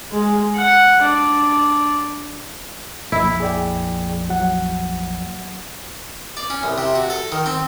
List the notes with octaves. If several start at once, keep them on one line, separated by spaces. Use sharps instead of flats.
G#3
F#5
D4
A#1 F2 E4
G#4 D5 G5
F#3 F#5
D5
C#4
C2
C3
F#4
A4
D#3
C4